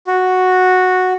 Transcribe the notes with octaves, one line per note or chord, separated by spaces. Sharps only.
F#4